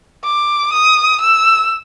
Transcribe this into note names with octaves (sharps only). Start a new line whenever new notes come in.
D6
D#6
E6